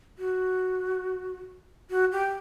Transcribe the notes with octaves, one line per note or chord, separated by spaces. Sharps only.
F#4
F#4
G4